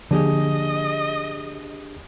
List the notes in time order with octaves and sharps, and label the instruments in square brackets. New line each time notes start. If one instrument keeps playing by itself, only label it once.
[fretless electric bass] D3 F3 A#3 [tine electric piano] D4 G4 G#4 [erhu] D#5